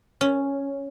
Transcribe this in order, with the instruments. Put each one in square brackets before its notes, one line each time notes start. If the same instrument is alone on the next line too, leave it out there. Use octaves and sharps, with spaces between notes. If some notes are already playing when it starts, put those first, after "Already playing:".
[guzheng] C#4